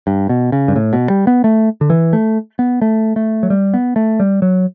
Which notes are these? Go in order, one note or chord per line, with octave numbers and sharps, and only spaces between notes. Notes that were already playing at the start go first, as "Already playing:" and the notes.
G2
B2
C#3
G2
A2
B2
G3
B3
A3
D3
E3
A3
B3
A3
A3
F#3
G3
B3
A3
G3
F#3